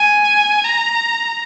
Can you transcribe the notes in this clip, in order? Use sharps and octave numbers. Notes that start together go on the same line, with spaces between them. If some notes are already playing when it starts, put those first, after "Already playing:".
Already playing: G#5
A#5